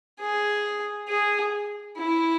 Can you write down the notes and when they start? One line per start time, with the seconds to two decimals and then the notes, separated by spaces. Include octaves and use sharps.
0.20 G#4
1.08 G#4
1.97 E4